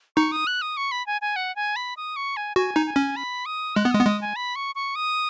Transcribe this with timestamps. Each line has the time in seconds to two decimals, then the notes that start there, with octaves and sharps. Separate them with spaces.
0.16 D#4 C#6
0.32 D#6
0.47 F#6
0.62 D#6
0.77 C#6
0.92 B5
1.07 G#5
1.21 G#5
1.36 F#5
1.56 G#5
1.76 B5
1.97 D#6
2.16 C#6
2.37 G#5
2.56 F#4 G#5
2.76 D#4
2.86 G#5
2.96 C#4
3.16 B5
3.46 D#6
3.76 G#3 F#6
3.85 B3
3.91 G#3 D#6
4.01 B3
4.06 G#3 D#6
4.21 G#5
4.36 B5
4.56 C#6
4.75 C#6
4.96 D#6